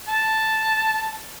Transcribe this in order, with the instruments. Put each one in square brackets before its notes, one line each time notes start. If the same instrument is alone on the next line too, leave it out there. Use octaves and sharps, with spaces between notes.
[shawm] A5